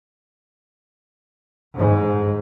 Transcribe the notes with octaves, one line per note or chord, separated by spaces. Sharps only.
G#2